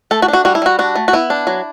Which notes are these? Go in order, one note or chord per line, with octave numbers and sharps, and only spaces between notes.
A3 A4
F#4
D4
F#4
G3 F#4
E4
G3 F#4
D4 F#4
A3
F#4
B3 E4
D4
F#3